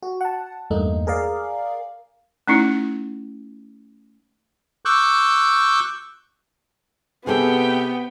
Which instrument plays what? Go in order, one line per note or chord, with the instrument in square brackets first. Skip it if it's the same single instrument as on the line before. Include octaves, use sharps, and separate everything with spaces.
[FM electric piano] F#4
F#5 A5
E2 G2 A3 A#3 D#4
G#4 A#4 D5 F5
[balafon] A3 C#4 D#4 E4
[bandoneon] C#6 D6 E6 F#6 G6
[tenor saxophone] C3 [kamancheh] B3 [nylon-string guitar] G#4 A4 [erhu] G5